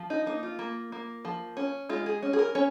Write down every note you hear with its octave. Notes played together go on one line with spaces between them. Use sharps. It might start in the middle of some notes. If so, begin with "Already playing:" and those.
Already playing: F3
D#4
A#3 D#4
F4
A#3
A#3
F3
C#4
G#3 F4
G#4
C#4
G#4
A#4
C#4 C#5